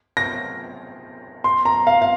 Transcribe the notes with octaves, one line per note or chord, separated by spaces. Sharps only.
A#6
C6
A#5
F5
F5